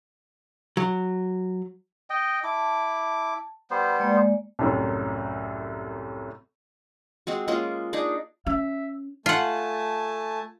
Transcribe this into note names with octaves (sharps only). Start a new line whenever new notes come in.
F#3
D#5 G5
E4 A5 D6
G3 B3 C5
G#3 A#3 D5
C2 F#2 A2
G#3 C4 F#4
G#3 A#3 C#4 F4
D4 D#4 G#4 D5
C#4 E5
A3 F4 F#5 G#5 A5